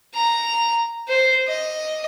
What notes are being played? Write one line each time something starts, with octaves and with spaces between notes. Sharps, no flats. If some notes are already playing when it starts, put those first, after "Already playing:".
A#5
C5
D#5